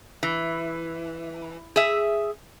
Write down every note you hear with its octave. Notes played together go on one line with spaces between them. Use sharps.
E3
G#4 E5